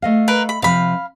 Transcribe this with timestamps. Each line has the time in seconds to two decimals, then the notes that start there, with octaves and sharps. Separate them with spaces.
0.02 A3 D#5 F5
0.28 A#4 B4
0.49 B5
0.62 C3 F3 F5 B5